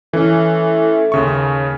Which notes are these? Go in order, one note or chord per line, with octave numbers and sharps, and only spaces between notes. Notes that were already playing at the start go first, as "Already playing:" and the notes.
E3 A3 C#4
D#2 C#3 C#6